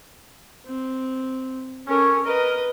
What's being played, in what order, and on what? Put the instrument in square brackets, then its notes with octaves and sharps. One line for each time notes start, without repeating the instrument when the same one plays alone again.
[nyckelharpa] C4
[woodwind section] C#4 [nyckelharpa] A4 A#4
[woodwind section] A#4 [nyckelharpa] B4 D#5